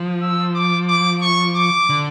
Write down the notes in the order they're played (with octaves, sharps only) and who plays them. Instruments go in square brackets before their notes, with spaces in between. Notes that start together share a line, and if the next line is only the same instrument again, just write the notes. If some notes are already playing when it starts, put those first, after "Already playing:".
Already playing: [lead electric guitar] F3
[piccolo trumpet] E6
D6
D6
C#6
D6
[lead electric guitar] D3